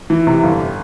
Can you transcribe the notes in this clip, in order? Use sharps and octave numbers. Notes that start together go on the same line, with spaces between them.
E3
C3
G1